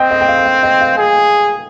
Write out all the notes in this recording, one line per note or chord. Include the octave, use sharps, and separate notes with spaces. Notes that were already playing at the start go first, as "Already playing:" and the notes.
Already playing: C4 D#5 G5
D#5
G5
F5
G5
F5
D#5 G5
F5
G#4